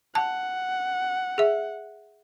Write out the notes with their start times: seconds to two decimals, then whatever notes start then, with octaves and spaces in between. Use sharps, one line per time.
0.15 F#5 A5
1.38 G#4 E5